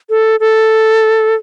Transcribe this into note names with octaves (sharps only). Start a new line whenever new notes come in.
A4
A4